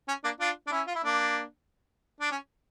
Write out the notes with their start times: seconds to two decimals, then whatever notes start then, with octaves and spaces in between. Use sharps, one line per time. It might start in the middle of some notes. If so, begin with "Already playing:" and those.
0.08 C#4
0.24 A#3 D4
0.40 D4 F4
0.67 D4
0.71 C#4 E4
0.87 F4
0.95 E4
1.04 A#3 D4
2.20 D4
2.31 C#4